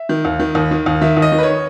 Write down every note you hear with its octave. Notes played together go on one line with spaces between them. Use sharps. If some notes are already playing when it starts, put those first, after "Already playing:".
Already playing: E5
D#3
D#2
D#3
D#2
D#3
D#2
D#3 E5
D#2
D#5
D#3
B4
C#5